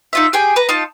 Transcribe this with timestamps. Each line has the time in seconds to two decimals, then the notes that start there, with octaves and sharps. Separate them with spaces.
0.13 D#4 F4 E5
0.33 G4 G#4 G5 G#5
0.56 B4 A#5
0.69 D#4 F4 F5 A5